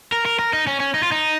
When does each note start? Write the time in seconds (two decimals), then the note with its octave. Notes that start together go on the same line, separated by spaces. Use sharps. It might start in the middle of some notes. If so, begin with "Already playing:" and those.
0.12 A#4
0.26 A#4
0.39 A#4
0.53 D#4
0.67 C#4
0.80 C#4
0.94 D#4
1.03 F4
1.12 D#4